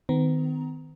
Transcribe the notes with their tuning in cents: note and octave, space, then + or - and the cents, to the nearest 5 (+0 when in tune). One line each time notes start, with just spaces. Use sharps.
D#3 +0 B3 +45 A#5 +10